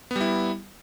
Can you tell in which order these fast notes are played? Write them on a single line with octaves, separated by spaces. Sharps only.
B3 G3 E4